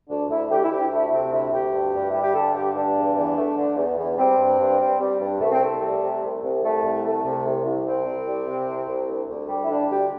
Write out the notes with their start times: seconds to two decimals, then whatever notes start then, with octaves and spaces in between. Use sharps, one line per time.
0.09 D2 D4
0.29 D2 E4
0.50 D2 G4
0.63 E4
0.71 D2 G4
0.91 A3 E4
1.11 C3 C4
1.32 D2 E4
1.52 D2 G4
1.72 G2
1.93 G2
2.10 G3 E4
2.22 G4
2.34 D3 A4
2.54 G2 G4
2.75 G2 D4
2.96 E2
3.16 E2
3.37 A3
3.57 D3
3.77 E2
3.97 E2
4.18 G3 C4
4.38 G2
4.59 G2
4.79 G3
5.00 G3
5.20 G2
5.41 C2 A3
5.52 C4
5.61 C2 A3
5.81 G3
6.02 C3
6.22 C2
6.43 C2
6.63 C2 A3
6.83 C2
7.04 A3
7.24 C3
7.45 C2
7.65 C2
7.86 C2 C4
8.06 C2
8.27 G3
8.47 C3
8.68 C2
8.87 C2
9.09 D2
9.29 D2
9.49 G3
9.63 E4
9.69 D3 D4
9.90 D2 G4